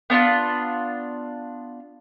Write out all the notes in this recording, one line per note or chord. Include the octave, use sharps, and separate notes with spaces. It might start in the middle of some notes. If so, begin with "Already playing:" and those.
B3 D4 E4 F4